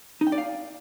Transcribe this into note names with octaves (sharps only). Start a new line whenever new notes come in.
D#4
G5
D5
F5